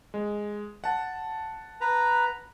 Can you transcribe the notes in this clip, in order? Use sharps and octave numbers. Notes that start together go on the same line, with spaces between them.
G#3
F#5 A5
B4 A#5